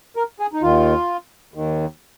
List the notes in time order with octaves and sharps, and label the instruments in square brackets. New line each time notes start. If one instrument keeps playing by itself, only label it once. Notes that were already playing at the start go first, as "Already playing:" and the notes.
[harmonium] A#4
G#4
D#4
D#2 D#3 F4
D#2 D#3